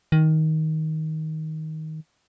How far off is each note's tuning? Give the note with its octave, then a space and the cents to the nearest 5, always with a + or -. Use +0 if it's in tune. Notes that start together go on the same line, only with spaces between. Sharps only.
D#3 +15